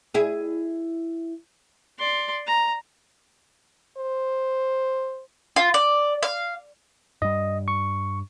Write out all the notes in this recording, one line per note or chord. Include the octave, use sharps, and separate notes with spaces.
E4 G#4
D5 C6
A#5
C5
F4
D5
F5
G2 G3 D#5
C#6